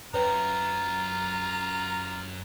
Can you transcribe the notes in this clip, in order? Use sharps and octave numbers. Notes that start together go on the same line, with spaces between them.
F#2 F4 B4 C#5 G5 A#5